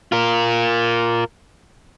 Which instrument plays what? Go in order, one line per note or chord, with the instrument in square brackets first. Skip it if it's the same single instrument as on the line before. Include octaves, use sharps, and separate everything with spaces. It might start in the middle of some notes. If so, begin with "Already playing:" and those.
[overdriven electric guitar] F4 A#4